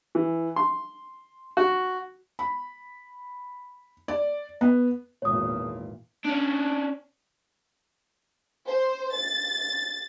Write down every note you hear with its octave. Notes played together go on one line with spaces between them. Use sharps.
E3
C6
F#4
B5
D5
B3
G#1 E2 A#2 C#5 D#6
C#4 D4
C5
A6